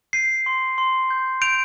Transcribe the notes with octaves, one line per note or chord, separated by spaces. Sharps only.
G6 C7 D#7
C6
C6
G6
G6 D7 F7